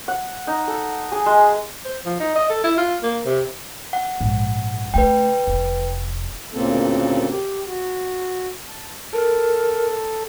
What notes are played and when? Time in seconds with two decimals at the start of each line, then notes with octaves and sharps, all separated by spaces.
0.08 F#5
0.47 D#4
0.68 A4
1.12 G#4
1.26 G#3
1.85 C5
2.05 F3
2.20 D#4
2.36 D#5
2.50 A4
2.64 E4
2.78 F4
3.03 A#3
3.25 C3
3.93 F#5
4.21 A#1 G#2
4.94 C#3 A3 B4 G5
5.47 F1
6.54 D2 A#2 C#3 A#3 C4 A4
7.31 G4
7.67 F#4
8.68 A5
9.13 A4 A#4